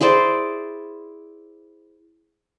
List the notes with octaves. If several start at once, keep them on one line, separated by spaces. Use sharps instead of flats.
E4 G#4 C5 D5